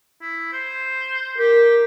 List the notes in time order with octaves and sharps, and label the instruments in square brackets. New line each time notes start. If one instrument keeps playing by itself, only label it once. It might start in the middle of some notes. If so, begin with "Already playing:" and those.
[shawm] E4
C5
[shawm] G4 [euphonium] A#4